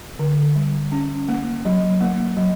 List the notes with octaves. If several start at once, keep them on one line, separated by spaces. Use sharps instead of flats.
D3
G3
C#4
A#3
F#3
A#3
F#3